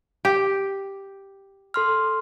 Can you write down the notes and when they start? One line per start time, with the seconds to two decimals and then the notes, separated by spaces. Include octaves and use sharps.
0.25 G4
1.74 A4 C6 F6